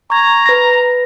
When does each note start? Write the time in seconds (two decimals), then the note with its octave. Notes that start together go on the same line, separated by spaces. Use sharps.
0.10 A#5 C#6 G#6
0.46 B4 A#6